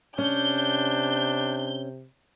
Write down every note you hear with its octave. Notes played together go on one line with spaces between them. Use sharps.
C3 C#4 D4 G6